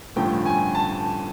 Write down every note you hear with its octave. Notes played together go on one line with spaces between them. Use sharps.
A1 G2 D3 F3 A3 G5
G#5
A5